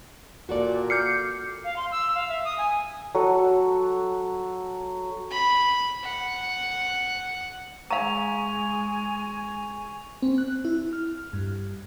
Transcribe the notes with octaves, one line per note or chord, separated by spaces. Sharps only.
A#2 F#4 A4 D5
D6 F6 G6 C7 C#7
F5
C6
E6
F5
E5
D#6
G#5
F#3 A4 F#5
B5
F#5
G#3 F5 G#5 A#5 C#6 F7
C4
F#6
E4
F6
G2